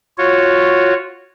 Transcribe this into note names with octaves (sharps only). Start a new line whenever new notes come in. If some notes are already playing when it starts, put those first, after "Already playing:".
F4 F#4 C#5